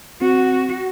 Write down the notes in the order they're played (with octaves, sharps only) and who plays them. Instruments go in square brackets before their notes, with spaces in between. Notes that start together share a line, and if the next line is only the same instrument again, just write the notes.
[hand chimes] C4 [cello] F#4